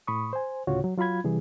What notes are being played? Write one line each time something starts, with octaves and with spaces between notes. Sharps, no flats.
A2 B5 C#6 D#6
C5 G#5
D2 A2 C#3 F4 F#4 C#5
F#3
F#3 F4 F5 B5 G#6
C3 E3 G3 G#4